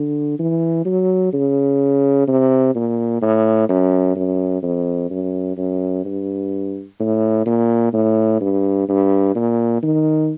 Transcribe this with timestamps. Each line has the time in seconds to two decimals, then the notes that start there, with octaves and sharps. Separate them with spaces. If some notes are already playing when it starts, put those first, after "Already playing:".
Already playing: D3
0.39 E3
0.85 F#3
1.33 C#3
2.28 C3
2.75 A#2
3.22 A2
3.69 F#2
4.16 F#2
4.63 F2
5.10 F#2
5.57 F#2
6.05 G2
7.00 A2
7.46 A#2
7.94 A2
8.41 G2
8.89 G2
9.36 A#2
9.83 D#3